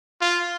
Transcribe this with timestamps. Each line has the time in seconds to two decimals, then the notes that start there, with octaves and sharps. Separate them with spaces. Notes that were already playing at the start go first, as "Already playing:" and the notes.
0.21 F4